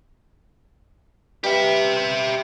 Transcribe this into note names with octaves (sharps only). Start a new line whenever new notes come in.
G3 G4 B4 E5 F5